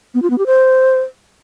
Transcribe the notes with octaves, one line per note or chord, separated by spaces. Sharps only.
B3
F4
B3
G4
C5